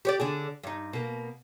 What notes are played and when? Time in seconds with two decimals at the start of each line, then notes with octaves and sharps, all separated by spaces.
0.05 G4 C#5 D5
0.20 D3 D4 G#4
0.64 G2 D#4
0.93 B2 A#3